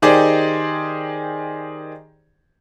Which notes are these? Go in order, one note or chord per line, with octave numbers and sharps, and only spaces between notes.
D#3 D#4 G4 G#4 C5 D5